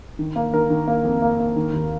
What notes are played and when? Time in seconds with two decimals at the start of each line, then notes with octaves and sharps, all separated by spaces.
0.19 D#3
0.36 A#3
0.53 D#3 A#4
0.70 D#3
0.88 A#3
1.04 F2
1.22 A#3
1.40 A#3
1.56 D#3
1.73 D#2